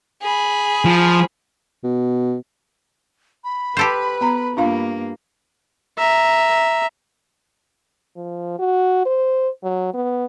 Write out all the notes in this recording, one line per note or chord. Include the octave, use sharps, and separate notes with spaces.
G#4 B5
F3
B2
B5
G4 A4 B4 C5
B3 A#5
G2 A#3 D4 F4 F5
E5 A#5
F3
F#4
C5
F#3
B3